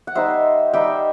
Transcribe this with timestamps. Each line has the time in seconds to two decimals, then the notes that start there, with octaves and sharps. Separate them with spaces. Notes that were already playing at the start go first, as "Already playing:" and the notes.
0.07 F#5
0.15 G3 D#4 C5 E5
0.73 G3 D#4 E5 G5